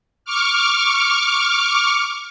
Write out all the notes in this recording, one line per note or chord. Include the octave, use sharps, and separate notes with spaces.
C#6 D6 F6